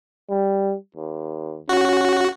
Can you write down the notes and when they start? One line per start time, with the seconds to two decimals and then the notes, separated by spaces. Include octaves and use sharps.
0.30 G3
0.96 D#2
1.69 C#4 F#4